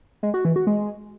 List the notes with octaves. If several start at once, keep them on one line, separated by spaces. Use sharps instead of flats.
G#3
F#4
E3
F#4
G#3